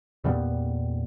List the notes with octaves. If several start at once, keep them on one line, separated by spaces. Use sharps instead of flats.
E2 A#2 G3 B3